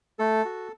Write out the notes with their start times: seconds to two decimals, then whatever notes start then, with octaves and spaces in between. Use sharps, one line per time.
0.19 A3 A4
0.45 F#4